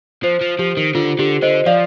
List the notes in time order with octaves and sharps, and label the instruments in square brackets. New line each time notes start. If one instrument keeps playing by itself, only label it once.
[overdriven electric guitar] F3 [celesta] C5
[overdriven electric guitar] F3
[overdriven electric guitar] F3 [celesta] G4
[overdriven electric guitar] D#3
[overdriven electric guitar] D3 [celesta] F4
[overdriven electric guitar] D3 [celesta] G4
[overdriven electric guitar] D3 [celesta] C5 D#5
[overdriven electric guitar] F3 [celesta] D5 F5